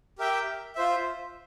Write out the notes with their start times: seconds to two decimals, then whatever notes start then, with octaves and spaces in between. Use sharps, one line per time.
0.19 G4 A#4 E5 G5
0.75 F4 C5 E5